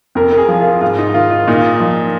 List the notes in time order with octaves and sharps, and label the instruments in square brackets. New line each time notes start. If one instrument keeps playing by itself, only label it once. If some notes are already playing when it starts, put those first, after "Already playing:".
[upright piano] F2 A#4
A#4
G#4
F3
F4
G#2 F4
D#4
D#3 F4
F4
A#2 D#4
F3